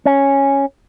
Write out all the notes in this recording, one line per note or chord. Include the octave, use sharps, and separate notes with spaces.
C#4